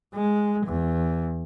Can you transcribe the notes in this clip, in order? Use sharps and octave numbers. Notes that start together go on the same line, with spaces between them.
G#3
E2